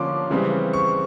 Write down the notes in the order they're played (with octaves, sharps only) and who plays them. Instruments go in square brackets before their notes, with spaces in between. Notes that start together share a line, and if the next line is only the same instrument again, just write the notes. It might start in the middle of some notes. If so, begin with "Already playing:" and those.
Already playing: [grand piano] D3 F3 A#3 C#4 C6 D6
C#3 E3 G3 C4
C#6